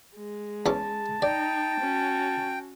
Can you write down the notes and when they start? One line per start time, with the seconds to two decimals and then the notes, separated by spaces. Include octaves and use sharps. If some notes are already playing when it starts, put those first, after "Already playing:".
0.15 G#3
0.66 E2 C#4 A5 D6
1.22 D#4 D5 G5
1.80 C#4 F#4